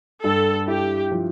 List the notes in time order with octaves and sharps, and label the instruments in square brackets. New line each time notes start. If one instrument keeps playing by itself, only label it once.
[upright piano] G2 [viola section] A4
[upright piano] E4 [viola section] G4
[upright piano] F3